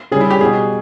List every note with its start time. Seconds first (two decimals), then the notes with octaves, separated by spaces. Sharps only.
0.11 C#3 G3 G#4
0.21 E4
0.30 G4
0.40 B2 G3 G#4